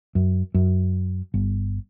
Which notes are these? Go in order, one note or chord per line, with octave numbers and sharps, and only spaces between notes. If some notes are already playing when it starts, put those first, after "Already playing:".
F#2
F#2
G1